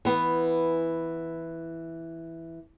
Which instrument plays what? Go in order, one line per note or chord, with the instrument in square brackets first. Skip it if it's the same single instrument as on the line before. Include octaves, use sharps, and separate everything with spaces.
[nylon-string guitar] E3 B3